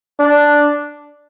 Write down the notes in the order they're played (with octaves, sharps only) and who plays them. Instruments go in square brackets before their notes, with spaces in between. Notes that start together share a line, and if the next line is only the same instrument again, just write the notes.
[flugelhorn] D4